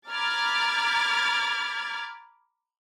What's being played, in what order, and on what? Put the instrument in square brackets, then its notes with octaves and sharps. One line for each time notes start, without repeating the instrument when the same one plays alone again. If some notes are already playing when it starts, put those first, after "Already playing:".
[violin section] A#5 B5 D6 F6 G#6 A6